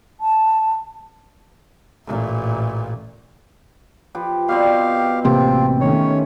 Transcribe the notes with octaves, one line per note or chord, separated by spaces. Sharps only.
A5
A1 A#2
F3 G4 B4
B2 G3 C4 G4 F5
A1 C3 A#3 C4 F4 G4
D#3 A3 C#4 C#5